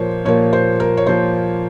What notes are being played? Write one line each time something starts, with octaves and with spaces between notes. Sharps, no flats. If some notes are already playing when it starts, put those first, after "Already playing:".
Already playing: A#2 F3 A#3 C5 C#5
A#2 F3 A#3 C#5
C5
A#4
C#5
A#2 F3 A#3 C5